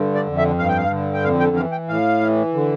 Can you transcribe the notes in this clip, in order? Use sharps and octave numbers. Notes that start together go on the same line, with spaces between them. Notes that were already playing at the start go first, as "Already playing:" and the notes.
Already playing: G2 D3
D5
F2
E5
G2 F5
G5
F5
D3
G5
F2 F5
G5
E3 F5
G5
A2 F5
E3
D3